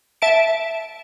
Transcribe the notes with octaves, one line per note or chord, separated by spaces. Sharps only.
E5 A5 D7